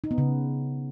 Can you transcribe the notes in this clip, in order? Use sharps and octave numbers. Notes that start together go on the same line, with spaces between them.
D#4
B3
C#3